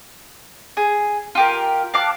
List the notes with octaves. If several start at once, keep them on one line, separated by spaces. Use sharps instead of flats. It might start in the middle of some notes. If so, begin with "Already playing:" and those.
G#4
F4 G4 A#4
F5 A5 D6 F#6